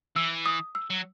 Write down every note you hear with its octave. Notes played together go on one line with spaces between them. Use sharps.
E3 E6
D#6
E6
F#3